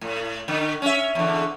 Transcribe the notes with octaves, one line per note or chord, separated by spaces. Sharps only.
A2
D3
C#4 E5
E2 D3